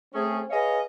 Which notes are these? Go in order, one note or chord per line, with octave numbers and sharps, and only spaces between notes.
A3 C4 C#4 G#4
G#4 B4 C#5 D#5 F5